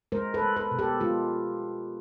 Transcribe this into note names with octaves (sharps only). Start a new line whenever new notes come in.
G#3 A#4 C5
A4 B4
G#3
A4 B4
B2
G4 A4
G#3 F4 G4